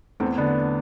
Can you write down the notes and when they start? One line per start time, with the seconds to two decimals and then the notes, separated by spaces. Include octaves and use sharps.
0.20 E2 A3 C4
0.38 D3 B3 D4